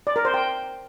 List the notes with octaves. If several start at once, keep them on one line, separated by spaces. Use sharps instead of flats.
D5
A#4
C5
G5